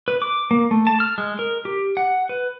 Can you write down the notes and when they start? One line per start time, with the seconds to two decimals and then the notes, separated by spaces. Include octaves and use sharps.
0.08 B4
0.22 D6
0.51 A#3
0.71 A3
0.87 A5
1.00 F6
1.18 G#3
1.39 A#4
1.65 G4
1.97 F#5
2.29 B4